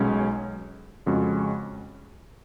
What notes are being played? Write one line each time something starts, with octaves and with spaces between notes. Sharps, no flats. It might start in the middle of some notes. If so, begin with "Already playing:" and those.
Already playing: B1 B2 G#3 C#4
F2 C#3 G#3 C#4 F#4